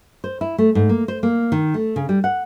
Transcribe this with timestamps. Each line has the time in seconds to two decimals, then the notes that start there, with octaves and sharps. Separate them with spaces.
0.24 C5
0.41 E4
0.58 A3
0.75 G#2
0.89 A#3
1.08 C5
1.23 A#3
1.52 D#3
1.74 A3
1.96 C#3
2.09 G3
2.24 F#5